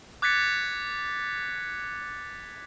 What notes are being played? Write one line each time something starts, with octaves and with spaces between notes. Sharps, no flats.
D6 F#6 G#6 A6 B6 C#7